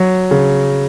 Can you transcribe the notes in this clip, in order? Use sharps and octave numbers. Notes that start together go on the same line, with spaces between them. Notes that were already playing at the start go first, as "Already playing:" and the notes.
Already playing: F#3
C#3